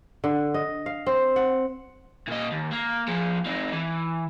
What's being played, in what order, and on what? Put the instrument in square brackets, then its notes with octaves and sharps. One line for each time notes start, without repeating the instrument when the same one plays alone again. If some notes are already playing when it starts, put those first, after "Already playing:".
[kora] D3
D#5
F5
C4
F#5
[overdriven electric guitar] A#2 D#5
D#2
A#3
F3 G#4
C4 D#4
E3